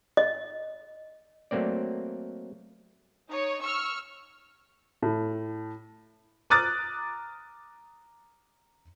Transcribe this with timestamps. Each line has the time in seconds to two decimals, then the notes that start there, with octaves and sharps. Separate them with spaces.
0.17 D#5
1.51 F#3 A3 A#3 C4 D5
3.29 D#4 C#5
3.60 C#6 E6 F6
5.02 A2
6.50 A#5 D6 D#6 F6 F#6 A6